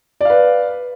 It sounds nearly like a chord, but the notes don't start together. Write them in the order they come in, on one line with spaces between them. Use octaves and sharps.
D5 F5 B4